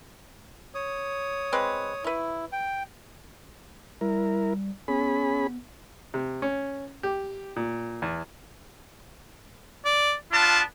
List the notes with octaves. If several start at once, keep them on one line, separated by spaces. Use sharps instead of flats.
C#5 D#6
G#3 C4 B4
E4 B4 C#5
G5
G3 E4 A#4
B3 C#4 G#4 B5
C3
C#4
G4
A#2
E2
D5
B3 D4 F4 A5